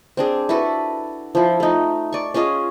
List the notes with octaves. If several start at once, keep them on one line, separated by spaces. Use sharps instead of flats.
C4 D4 G#4
E4 F#4 A4 B4
F3 E4
A3 D#4
D5 C#6
C#4 F4 G#4 D#5